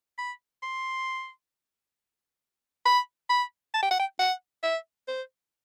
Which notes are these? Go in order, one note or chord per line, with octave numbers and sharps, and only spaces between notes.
B5
C6
B5
B5
A5
G5
F#5
G5
F#5
E5
C5